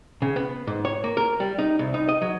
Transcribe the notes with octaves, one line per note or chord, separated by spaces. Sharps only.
C#3
B3
G#2
C#5
A#3
A#4
G3
D#4
C2
D#4
D#5
F#3